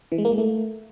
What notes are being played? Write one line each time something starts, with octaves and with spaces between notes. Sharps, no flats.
E3
G#3
A#3
G#3
A3